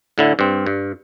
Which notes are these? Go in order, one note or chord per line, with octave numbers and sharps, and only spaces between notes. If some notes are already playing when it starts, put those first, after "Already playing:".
A2 D3 E4
G2 C4
G2